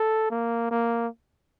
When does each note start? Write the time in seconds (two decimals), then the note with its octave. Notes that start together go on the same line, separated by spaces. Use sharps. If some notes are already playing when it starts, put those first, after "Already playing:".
Already playing: A4
0.31 A#3
0.71 A#3